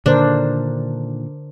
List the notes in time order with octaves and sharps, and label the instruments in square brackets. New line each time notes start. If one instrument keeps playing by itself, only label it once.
[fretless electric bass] A#2 D#3 [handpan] D3 A#4 C5 [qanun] D4